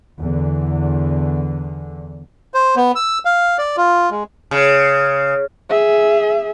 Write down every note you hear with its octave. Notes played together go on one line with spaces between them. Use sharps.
E2 D3
C5
B3
E6
F5
D5
F4
G#3
C#3
G#4 E5